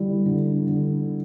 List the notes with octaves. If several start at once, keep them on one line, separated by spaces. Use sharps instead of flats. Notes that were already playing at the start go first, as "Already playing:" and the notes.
Already playing: D3 G3 E4
D3
D3